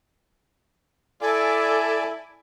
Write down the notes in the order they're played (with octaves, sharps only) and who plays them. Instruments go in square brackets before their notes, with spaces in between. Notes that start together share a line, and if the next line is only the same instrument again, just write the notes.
[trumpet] E4 [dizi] A4 [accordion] D5 G#5 D6